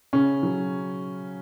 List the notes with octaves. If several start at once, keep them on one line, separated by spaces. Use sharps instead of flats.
C#3 C#4
F#3